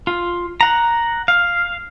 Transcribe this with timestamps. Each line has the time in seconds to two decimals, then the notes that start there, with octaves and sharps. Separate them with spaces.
0.07 F4
0.61 F#5 A#5
1.28 F5